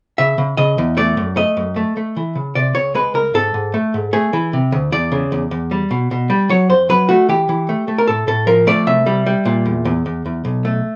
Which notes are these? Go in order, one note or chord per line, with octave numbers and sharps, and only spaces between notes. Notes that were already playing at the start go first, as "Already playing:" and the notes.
C#3 E5
C#3
C#3 D#5
E2
A3 D5
F#2
A3 D#5
F#2
A3
A3
E3
C#3
C3 D5
C#2 C#5
G#3 B4
C#2 A#4
G#2 A4
G#2
A3
G#2
A3 G#4
E3
C3
D2
E2 D5
C#3
E2
E2
G3
B2
B2
G3
F#3 C#5
F2 C5
F#3 B4
A3 F#4
E3 G4
E3
A3
A3
A#4
A2 A4
A2 A4
F3 A#4
A3 D5
C2 E5
G3
G3
A#2
E2
E2
E2
E2
B1
A3